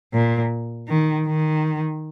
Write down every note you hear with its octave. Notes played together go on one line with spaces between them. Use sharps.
A#2
D#3
D#3